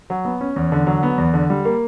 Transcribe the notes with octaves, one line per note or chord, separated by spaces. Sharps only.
F#3
B3
C#4
E2
D3
F#3
B3
E2
D3
G3
A#3